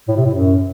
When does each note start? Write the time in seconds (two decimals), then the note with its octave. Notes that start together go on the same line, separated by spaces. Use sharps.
0.08 A2
0.17 C3
0.25 A2
0.34 F#2